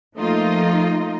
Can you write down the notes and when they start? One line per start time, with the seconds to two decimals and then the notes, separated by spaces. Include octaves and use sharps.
0.17 F3 A3 A#3 D#4 F4 D#5